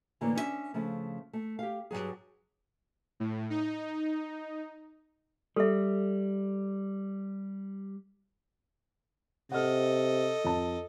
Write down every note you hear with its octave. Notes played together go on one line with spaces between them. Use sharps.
A2 D3 E3 A#3 C#5
C#4 D4 E4 E5
C#3 F3 A3 C#4
A3
G4 F5
G2 F3 F#3 G#4
A2
D#4
G3 A4 E5
C3 A4 D#5 F#5 F6
F2 A5